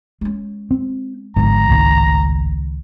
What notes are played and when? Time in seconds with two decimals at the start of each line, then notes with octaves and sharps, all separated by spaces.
0.21 G#3 C#4
0.71 C4
1.36 G#1 F2 G#2 D3 A#5
1.69 C#2 A2 D#3